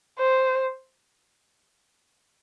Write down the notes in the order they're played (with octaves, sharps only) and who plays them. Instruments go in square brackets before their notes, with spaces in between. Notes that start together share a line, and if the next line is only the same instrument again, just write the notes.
[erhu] C5